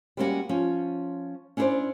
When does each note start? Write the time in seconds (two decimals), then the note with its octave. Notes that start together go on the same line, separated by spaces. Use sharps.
0.17 G3 G#3 A#3 C#4 D4 F#4
0.49 F3 C#4
1.57 C#4 D4 E4 A4 C5 D5